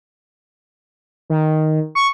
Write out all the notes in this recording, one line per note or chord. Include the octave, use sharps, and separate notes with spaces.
D#3
C#6